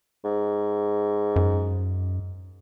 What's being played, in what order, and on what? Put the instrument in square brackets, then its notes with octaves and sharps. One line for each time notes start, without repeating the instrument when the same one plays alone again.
[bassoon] G#2
[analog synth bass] F#2